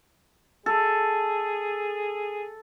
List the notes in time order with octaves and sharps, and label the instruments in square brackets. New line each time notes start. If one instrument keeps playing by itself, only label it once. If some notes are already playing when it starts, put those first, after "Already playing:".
[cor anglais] G#4 [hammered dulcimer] A4